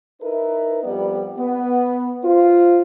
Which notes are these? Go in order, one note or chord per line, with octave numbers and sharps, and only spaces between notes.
D#4 E4 A#4 B4
F2 G3 B3 G4 D5
B3
F4 C5